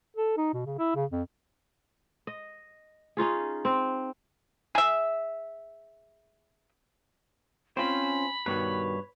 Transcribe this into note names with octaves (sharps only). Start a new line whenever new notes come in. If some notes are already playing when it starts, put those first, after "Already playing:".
A4
D#4
B2
C#3
E4
C#3
F2
D#5
C#4 D#4 F4 G#4
C4
G#4 E5
C4 C#4 F4 C5 B5
G2 B2 D#3 B4 C#5